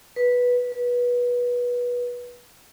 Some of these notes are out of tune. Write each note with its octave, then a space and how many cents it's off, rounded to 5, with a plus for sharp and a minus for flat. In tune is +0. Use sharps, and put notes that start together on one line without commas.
B4 -10
B4 -20